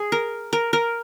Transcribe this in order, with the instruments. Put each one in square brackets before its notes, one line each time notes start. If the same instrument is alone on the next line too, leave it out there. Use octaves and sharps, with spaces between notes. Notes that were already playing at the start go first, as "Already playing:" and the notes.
Already playing: [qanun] G#4
A#4
A#4
A#4